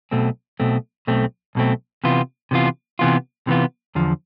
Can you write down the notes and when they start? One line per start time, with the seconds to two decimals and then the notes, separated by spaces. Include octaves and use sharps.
0.11 B1 B2 A3 C4
0.60 B1 B2 A3 C4
1.07 B1 B2 A3 C4
1.55 B1 B2 A3 C4
2.04 C3 E3 B3 F4
2.51 C3 E3 B3 F4
2.99 C3 E3 B3 F4
3.47 C3 E3 B3 F4
3.95 E2 D3 F3